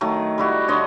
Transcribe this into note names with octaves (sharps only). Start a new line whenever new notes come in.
D#3 F#3 A3
G3 E4 F#4
D3 C#5 D#5 C6